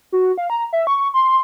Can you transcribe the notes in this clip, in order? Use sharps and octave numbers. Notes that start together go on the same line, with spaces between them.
F#4
F5
A#5
E5
C#6
C6